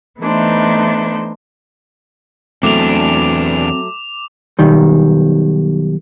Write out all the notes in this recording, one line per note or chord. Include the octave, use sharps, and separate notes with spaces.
E3 A3 B3 D4 D#4 C5
E2 F#3 A3 C4 D4 D6 F7
B1 D#3 G3